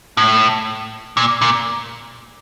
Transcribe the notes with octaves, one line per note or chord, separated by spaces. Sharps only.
A2
A#2
A#2